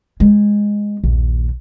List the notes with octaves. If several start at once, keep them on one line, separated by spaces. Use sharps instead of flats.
G#3
A#1 D#2